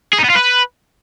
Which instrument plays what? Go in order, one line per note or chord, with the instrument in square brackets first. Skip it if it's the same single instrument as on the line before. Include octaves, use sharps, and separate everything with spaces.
[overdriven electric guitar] G#4
D#4
B3
F4
B4